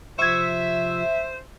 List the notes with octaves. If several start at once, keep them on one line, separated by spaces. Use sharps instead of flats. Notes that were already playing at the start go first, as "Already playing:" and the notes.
C3 F3 F4 C5 E5 C#6 E6 G#6